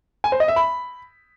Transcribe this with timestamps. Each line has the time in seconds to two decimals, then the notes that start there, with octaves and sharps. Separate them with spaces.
0.24 G#5
0.32 C5
0.40 D#5
0.48 E5
0.56 B5